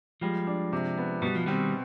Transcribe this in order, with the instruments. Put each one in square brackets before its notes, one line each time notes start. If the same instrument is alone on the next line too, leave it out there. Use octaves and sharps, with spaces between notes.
[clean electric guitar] F3 G#3 [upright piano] G3
[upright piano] D4
C3
B3
[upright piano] B2 [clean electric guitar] G3
[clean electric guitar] F3
[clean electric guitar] D#3 G3 [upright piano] C4